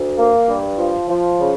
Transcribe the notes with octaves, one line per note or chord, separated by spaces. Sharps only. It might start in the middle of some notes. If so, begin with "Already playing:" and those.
Already playing: D2
A#3
G2
F3
F3
C#3